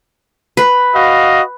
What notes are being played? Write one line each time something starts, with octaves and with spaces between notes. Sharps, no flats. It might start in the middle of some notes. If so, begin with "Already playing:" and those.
B4
F#4 D#5 F5